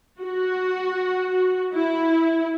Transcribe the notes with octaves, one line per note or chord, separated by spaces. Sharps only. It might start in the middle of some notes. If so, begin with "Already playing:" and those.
F#4
E4